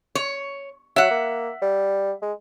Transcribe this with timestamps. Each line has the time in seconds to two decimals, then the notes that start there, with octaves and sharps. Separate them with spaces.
0.15 C#5
0.96 F#3 E5 F#5
1.11 A#3
1.62 G3
2.22 G#3